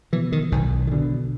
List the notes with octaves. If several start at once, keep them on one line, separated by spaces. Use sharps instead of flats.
B2 E3
D#3
B1 D#3
D#3
B2 D3